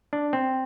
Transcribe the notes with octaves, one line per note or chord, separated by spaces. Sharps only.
D4
C4